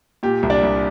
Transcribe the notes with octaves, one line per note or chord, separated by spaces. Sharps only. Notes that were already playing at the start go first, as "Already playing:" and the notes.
A#2 G4
C2
D4 D5
C2